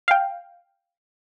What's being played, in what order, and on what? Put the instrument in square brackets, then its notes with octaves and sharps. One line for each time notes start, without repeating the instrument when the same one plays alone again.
[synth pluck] F5 G5